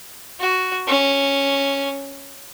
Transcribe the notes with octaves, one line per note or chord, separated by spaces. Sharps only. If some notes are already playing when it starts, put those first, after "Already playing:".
F#4
C#4